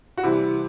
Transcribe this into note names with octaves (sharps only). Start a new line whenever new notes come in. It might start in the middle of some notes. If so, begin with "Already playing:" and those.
F#4
C3 E3 G3 E4